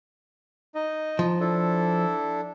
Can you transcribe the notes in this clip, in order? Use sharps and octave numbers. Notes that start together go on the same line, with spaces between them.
D#4 D#5
F3
D4 E4 A4